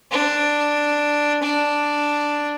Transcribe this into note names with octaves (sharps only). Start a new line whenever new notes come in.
D4
D4